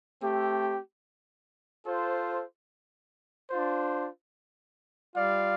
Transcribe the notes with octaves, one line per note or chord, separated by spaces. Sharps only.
A3 C4 G4
F4 A4 C5
D4 F4 C5
G3 F4 D5 F5